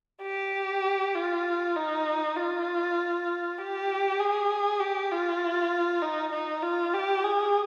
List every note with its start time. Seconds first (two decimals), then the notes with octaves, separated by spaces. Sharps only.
0.22 G4
1.15 F4
1.75 D#4
2.36 F4
3.57 G4
4.19 G#4
4.80 G4
5.11 F4
6.02 D#4
6.32 D#4
6.62 F4
6.93 G4
7.24 G#4